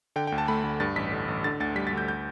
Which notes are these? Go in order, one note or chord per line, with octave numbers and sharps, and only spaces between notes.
D3 G5
D2 G5
A5
A3 B5
D2
G2 A6
A1 B6
D3
A1
D3 A6
D2 A6
G3 B6
A6
D2 G6
G6